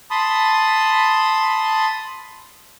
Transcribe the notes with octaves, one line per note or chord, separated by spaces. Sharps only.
A5 B5 C6 D#6